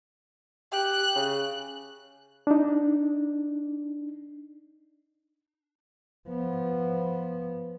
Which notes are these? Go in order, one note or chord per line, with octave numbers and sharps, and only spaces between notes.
G4 F#6
C#3
D4 D#4
F3 B3